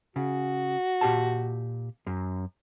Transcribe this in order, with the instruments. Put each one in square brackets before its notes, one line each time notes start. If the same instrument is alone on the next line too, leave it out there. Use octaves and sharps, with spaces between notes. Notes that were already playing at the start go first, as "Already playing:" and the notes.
[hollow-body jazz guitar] C#3 [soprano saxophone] F#4
[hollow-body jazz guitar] A#2 G4 A5
F#2